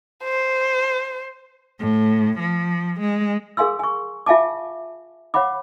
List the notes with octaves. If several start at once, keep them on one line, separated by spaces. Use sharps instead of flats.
C5
A2
F3
G#3
G#4 A#4 F5 G#5 C6 E6
G#5 C#6
F4 E5 F5 G#5 A5 D6
C#5 F5 F#5 B5 D6